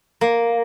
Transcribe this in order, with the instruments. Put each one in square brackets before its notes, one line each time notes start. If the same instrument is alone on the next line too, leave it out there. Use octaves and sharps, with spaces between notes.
[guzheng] A#3